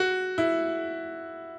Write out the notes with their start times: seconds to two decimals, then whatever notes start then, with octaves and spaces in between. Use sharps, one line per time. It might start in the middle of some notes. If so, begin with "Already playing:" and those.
Already playing: F#4
0.38 E4